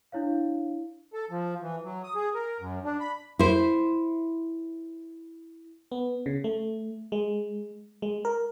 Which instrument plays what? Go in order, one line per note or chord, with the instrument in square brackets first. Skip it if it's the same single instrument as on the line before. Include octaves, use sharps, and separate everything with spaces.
[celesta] D4 E4 C#5 F5
[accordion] A4
F3
E3
F#3
D#6
G#4
A#4
F#2
D4
B5
[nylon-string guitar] E4 C5
[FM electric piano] B3
C#3
A3
G#3
G#3
A#4